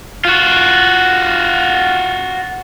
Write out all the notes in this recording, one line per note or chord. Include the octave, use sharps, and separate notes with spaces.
F4 F#4